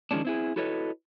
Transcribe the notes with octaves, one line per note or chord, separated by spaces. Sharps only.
D#3 F3 G#3 C#4 D4
C4 E4 G#4
E4 F#4 A4 B4 C#5 D#5